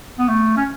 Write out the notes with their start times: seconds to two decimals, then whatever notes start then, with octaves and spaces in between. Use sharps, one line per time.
0.18 B3
0.29 A3
0.57 C#4